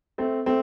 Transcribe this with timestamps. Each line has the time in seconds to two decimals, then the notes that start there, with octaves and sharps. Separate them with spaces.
0.18 A3 C4
0.46 A3 C4